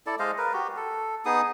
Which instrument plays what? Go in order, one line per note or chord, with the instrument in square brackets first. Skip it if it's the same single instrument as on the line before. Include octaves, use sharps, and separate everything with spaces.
[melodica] E4 A4 D5
G#3 C5 D#5 F5
A#4 B4
F#4 G4
A4
B3 D#4 G#4 D#6